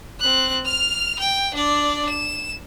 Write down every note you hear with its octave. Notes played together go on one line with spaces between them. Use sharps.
C4 F#6
F6 F7
G5
D4 D5
E7